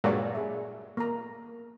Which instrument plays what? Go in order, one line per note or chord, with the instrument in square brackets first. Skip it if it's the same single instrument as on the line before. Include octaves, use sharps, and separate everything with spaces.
[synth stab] G2 A#2 F#3 [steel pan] G#3 D5
[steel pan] G#4 E5
A#3 A#4 A#5